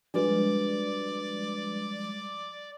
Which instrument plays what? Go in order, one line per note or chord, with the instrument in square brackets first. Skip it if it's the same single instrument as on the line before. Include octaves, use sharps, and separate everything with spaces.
[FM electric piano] F3 G3 G#3 [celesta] D4 F#4 B4 [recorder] D5